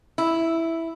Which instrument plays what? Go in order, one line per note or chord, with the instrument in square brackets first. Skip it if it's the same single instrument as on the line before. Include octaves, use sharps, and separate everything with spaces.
[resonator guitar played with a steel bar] E4